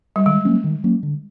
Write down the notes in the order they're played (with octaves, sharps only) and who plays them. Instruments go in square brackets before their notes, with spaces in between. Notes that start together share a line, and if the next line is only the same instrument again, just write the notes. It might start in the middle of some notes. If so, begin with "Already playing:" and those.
[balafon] G3
[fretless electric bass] D#3 [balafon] G#3
[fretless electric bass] F#3 A#3 C#4
D#3
F#3 A#3 C#4
D3